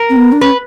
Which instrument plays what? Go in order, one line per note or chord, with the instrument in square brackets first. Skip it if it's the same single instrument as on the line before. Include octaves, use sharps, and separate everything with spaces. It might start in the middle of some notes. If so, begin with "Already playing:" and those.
Already playing: [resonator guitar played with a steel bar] A#4
[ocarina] C4
B3
D4
[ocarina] C#4 [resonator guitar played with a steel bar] B4